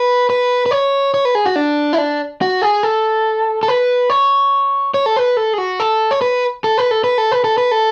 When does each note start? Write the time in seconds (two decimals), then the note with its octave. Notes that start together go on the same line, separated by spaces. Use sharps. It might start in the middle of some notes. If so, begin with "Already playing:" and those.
Already playing: B4
0.30 B4
0.66 B4
0.71 C#5
1.14 C#5
1.25 B4
1.35 G#4
1.46 F#4
1.56 D4
1.93 E4
1.98 D4
2.41 F#4
2.62 G#4
2.83 A4
3.63 A4
3.68 B4
4.10 C#5
4.94 C#5
5.06 A4
5.16 B4
5.37 A4
5.53 G#4
5.58 F#4
5.80 A4
6.11 C#5
6.21 B4
6.64 A4
6.78 B4
6.91 A4
7.04 B4
7.18 A4
7.31 B4
7.44 A4
7.58 B4
7.71 A4